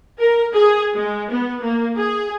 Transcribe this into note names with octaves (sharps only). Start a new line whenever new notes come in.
A#4
G#4
G#3
B3
A#3
G#4